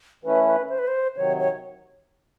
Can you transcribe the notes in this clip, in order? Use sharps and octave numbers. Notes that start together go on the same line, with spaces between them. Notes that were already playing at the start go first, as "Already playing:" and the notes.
E3 A3 C#4 E4 B4
B4
C5
B4
C5
C3 D#3 F#3 C#5
C#5